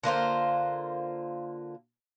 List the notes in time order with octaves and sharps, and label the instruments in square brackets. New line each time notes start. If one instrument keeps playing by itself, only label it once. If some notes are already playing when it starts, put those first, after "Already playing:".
[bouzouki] D3 A#3 F4 C5